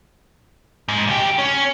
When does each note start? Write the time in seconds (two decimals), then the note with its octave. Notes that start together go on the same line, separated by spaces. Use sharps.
0.88 G#2
1.07 C#2 G4
1.39 C#4